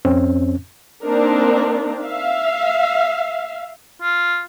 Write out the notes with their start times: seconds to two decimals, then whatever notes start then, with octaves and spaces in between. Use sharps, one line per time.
0.05 F2 C4 C#4
1.03 A#3 C4 D4 D#4 A#4
2.02 E5 F5
4.02 F4